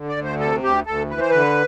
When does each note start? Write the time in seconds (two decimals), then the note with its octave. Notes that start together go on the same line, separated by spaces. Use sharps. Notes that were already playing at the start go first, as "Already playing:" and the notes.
Already playing: D3
0.09 D5
0.16 D2
0.24 C5
0.40 C3 A4
0.63 D2 G4
0.86 D2 A4
1.10 E3 B4
1.21 C5
1.30 D3 B4